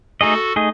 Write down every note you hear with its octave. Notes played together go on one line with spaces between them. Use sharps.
A3 D#4 F#4 G#4 A4 D#5
A3 D#4 G#4 D#5